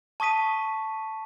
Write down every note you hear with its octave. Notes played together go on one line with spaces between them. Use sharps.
A5 C#6 D#6 B6 D#7